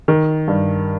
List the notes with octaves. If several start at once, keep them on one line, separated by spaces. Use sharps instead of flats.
D#3
G2